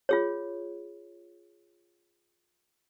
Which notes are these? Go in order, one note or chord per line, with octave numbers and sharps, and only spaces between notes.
F4 G#4 C#5